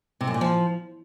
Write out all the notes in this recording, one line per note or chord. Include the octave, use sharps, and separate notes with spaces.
C3
F#2
A#2
F3